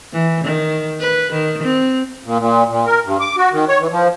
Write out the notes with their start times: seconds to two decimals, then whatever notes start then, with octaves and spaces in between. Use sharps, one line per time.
0.13 E3
0.44 D#3
1.00 B4
1.32 D#3
1.63 C4
2.26 A#2
2.39 A#2
2.69 A#2
2.86 A#4
3.05 G2
3.20 D6
3.37 F#4
3.52 D#3
3.69 C#5
3.80 E3
3.91 F3